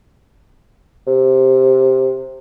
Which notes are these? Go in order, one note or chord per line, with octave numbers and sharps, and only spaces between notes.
C3